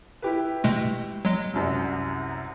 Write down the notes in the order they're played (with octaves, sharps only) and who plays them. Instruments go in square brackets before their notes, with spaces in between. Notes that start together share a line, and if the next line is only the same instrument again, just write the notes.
[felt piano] E4 G4 B4
[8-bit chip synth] B2 G#3 A3
F#3 G#3
[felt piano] C2 F#2 C3